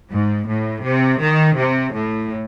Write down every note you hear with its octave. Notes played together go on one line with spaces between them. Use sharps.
G#2
A2
C3
D#3
C3
A2